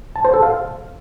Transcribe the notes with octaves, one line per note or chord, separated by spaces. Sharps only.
A5
C5
A4
F5